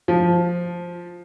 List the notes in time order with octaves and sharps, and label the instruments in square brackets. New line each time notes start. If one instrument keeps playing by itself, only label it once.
[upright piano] F3